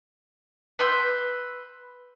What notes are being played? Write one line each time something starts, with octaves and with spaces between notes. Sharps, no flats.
B4 C6 E6 G6